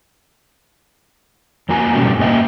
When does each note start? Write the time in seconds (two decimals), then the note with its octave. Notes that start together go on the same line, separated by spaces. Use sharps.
1.69 F2 A#3 F#4 G#5 A#5
1.95 G2 B2 G3 A3 C#4 G4
2.19 G2 A#3 D#5 E5 G5